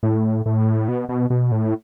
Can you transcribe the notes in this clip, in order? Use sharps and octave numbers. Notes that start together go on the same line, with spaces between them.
A2
A2
B2
B2
B2
A2